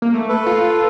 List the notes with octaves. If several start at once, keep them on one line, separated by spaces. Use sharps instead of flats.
A#3
A3
A4 B4
F4
F4